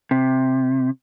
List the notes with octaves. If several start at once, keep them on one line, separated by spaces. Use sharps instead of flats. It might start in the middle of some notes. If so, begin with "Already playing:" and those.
C3